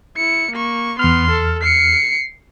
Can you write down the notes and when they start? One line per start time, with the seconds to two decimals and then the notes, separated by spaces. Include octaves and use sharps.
0.17 E4 C#7
0.51 A#3 C#6
0.99 E2 B3 C6 F6
1.31 A4
1.62 C7 C#7